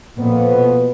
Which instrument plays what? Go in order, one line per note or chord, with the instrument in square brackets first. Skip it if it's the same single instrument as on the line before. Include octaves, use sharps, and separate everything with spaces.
[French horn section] F2 F3 B3 [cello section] A#2
[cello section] B2